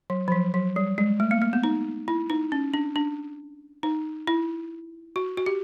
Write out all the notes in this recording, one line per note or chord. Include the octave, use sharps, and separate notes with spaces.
F#3
F3
F#3
F#3
G3
G#3
A3
A#3
A#3
B3
D#4
E4
D#4
C#4
D4
D4
D#4
E4
F#4
F#4
G4